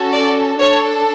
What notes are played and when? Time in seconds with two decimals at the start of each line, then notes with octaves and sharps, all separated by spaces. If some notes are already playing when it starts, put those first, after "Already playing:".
Already playing: C#4 F#4 A4
0.12 D5
0.58 D4 A4 C#5